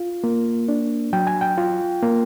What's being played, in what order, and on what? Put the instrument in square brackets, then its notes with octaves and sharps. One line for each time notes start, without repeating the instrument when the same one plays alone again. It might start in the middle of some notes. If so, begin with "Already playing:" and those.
Already playing: [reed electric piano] F4
A#3
D4
F#3 G5
G#5
G5
F4
A#3